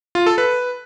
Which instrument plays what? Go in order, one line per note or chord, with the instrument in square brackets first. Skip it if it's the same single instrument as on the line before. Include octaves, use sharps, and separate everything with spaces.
[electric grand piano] F4
A4
B4